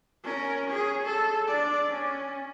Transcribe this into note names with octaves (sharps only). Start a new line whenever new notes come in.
C#4 A#4
G#4 C#5
A4
D4 D5
C#4